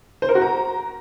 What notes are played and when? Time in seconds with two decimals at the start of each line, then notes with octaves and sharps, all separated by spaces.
0.22 C5
0.29 A#4
0.35 F#4
0.42 A#5